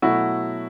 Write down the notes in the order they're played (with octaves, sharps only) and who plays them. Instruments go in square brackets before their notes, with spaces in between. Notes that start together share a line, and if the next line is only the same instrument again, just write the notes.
[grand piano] B2 F#3 A3 E4 F#4